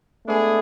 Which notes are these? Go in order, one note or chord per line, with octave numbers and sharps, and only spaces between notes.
G#3 A3 B3 D4 G#4